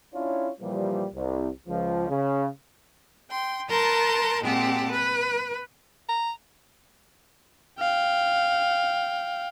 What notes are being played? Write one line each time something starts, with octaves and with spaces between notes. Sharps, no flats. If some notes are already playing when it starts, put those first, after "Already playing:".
C#4 D4 E4 F4 C#5
A#2 E3 F3 G3
C2
C#2 F3
C#3
G5 C6
A#4 B4 A5 A#5 C6 G6
A#2 G#3 C4 G4 F#5 A5
B4
A#5
F5 G5